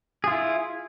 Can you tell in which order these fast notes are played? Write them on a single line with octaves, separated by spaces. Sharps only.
G#4 F4 E4